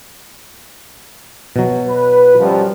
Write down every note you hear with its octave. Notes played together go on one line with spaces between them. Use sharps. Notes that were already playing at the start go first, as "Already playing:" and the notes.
B2 F#3
B4
F#2 F3 G3